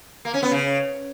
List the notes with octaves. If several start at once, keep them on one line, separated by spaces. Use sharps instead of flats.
A#3
C#4
B3
C#3